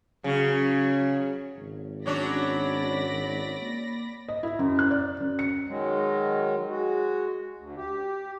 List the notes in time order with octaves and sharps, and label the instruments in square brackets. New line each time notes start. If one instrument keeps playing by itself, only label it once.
[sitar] C#3 [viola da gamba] F#3 C#4
[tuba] G#1
[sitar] F#3 C#4 D4 [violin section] D5 B5 A#6
[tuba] A#3
[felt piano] D#5
E4
F#2
F#6
D5
F#2
C#7
[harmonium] D#3 F#3 G#3
G#3 F#4
D2
G4